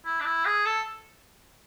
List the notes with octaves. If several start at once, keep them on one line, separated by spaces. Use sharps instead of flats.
E4
D4
E4
G#4
A4